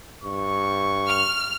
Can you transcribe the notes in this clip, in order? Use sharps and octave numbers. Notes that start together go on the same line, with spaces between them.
G2 C#6
F6